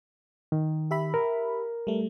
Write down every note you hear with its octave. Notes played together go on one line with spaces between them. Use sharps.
D#3
G4 E5 B5
A#4
G3 A3